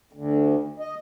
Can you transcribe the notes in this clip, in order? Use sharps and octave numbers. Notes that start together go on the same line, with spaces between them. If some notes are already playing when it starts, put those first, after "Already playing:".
D2
D#5